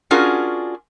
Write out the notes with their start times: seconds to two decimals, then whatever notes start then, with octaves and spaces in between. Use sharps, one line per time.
0.11 C#4 D4 F4 F#4 G#4 A#4